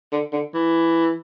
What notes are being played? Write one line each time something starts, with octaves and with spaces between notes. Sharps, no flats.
D3
D3
E3